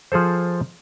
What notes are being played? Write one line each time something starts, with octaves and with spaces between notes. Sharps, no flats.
F3 G#4 A4 C5